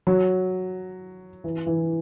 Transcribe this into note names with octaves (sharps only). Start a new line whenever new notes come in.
F#3
E3
E3